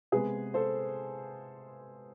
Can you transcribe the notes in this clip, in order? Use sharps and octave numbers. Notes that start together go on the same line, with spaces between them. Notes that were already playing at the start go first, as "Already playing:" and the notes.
C3 G#3 B3 G#4 B4
A4 C5